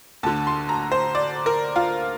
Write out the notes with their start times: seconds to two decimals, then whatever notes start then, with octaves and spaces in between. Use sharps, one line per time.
0.23 D2 D3 A5
0.47 C6
0.69 A#5
0.92 C5
1.15 D5
1.46 A#4
1.76 F4